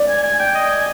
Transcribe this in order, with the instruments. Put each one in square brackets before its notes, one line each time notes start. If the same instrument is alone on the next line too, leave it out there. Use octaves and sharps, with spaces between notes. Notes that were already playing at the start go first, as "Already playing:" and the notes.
Already playing: [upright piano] D5
[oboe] G#5
G#5
G5
D#5
G#5